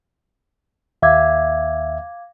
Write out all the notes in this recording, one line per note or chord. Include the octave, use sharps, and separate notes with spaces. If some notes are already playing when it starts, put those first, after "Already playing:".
D#2 E5 F5 D6 G#6